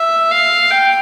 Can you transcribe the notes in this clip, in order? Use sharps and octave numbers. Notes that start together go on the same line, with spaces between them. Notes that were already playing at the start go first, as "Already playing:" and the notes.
Already playing: E5
F5
G5